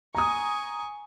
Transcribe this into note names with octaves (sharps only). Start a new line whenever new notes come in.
G#5 A#5 C#6 D#6